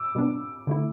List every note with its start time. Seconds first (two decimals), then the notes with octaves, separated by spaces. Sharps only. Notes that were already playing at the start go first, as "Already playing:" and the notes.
Already playing: D6 E6
0.15 B2 G3 B3 D4
0.67 D3 A3 E4